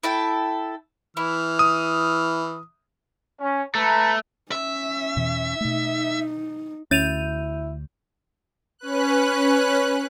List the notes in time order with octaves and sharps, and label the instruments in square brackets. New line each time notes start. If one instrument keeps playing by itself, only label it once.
[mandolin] E4 A4 G5
[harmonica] E3 F6 [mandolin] E4
[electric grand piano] D#6
[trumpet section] C#4
[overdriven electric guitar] A3 [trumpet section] B4 A5 A#5
[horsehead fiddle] C#4 [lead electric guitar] E5
[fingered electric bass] E2 B2 E3
[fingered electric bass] B2 A3 [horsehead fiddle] D#4
[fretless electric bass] D2 [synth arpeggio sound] C#4 A6 [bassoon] E4 [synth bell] G6 D#7 F7
[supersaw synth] C#4 B4 F#6